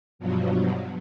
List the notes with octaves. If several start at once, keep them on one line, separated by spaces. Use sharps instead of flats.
G2 B2 F3 F#3